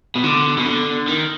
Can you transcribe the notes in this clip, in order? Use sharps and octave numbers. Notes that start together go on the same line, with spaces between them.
B2
D3
B2
D3
D#3